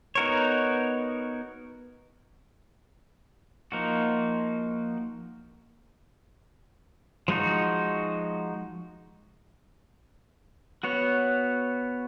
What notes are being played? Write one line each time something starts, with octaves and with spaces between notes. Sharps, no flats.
B3 D#4 F#4 A#4 C#5
F3 A#3 D#4 F#4
F3 G#3 D#4 F#4
B3 F#4 C#5